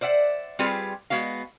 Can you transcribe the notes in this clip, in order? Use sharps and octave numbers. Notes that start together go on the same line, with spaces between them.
C5 D5 E5 F#5
G3 C4 F4 G4 G#4 B4
G#3 B3 F#4 F5